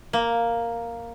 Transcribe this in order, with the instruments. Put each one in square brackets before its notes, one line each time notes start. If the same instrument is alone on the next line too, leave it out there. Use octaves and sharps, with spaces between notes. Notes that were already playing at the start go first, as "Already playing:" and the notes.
[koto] A#3